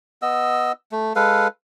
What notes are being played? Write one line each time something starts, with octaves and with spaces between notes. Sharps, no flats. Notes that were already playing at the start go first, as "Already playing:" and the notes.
B3 D#5 E6
A3
G#3 A4 B4 F5